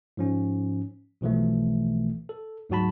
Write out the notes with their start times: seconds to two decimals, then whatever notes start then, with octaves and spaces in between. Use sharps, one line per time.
0.17 G#2 F3 C#4
1.21 B1 B2 E3 F3 A3
2.29 A4
2.69 D2 G#2 F#3 F#4 A5 B5